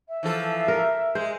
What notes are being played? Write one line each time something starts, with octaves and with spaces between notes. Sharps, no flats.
E5
E3 F3 A4
A#4
G#3 C5